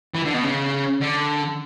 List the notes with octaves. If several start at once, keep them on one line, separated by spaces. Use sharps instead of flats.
E3
D3
B2
C#3
D3